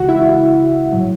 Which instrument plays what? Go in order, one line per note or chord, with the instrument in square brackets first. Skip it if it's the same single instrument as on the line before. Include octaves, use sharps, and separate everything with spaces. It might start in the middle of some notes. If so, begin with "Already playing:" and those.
Already playing: [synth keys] C#2 C#3 E3 G#3 F#4 F#5
E4 E5
A2 F#3